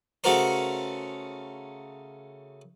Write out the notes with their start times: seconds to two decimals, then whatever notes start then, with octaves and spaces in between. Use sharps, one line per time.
0.24 C#3 A3 F#4 A#4 C5